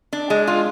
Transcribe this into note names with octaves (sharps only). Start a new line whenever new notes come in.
D4
G#3
F4